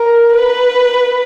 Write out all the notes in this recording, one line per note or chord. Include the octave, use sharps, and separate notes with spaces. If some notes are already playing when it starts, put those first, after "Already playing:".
Already playing: A#4
B4